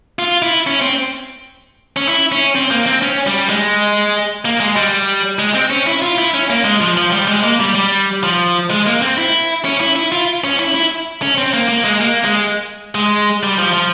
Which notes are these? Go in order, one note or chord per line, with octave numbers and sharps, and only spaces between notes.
F4
E4
C#4
C4
C#4
E4
C#4
C4
A#3
C4
C#4
G3
G#3
A#3
G#3
G3
G#3
C4
C#4
E4
F4
E4
C#4
A#3
G#3
F3
F3
G3
G#3
A#3
G3
G3
F3
G#3
A#3
C4
E4
C#4
E4
E4
F4
C#4
E4
E4
C#4
C4
A#3
A#3
G#3
A#3
G#3
G#3
G3
F3
F3